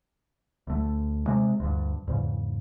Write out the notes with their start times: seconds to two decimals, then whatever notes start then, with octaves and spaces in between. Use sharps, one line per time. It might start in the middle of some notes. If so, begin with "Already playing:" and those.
0.67 D2 A3
1.26 C3 G#3
1.60 D2 G2
2.07 E2 G#2 C#3